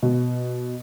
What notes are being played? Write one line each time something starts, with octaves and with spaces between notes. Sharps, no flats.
B2